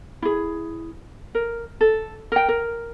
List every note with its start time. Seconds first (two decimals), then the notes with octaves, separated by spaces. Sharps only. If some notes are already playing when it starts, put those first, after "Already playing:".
0.22 E4 G#4
1.35 A#4
1.81 A4
2.32 A#4 G5
2.49 A#4